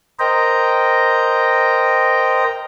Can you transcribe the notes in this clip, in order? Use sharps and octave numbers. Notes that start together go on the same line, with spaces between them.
A#4 C5 D#5 G5 A#5